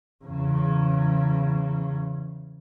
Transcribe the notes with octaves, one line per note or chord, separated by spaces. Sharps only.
E2 C#3